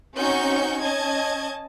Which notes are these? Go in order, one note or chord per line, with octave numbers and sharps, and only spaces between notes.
C4 C#4 D#4 F#4 C#6 G6
C#4 D#5 A5 G#6